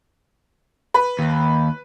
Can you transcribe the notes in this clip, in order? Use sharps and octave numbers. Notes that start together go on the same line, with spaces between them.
B4
D#2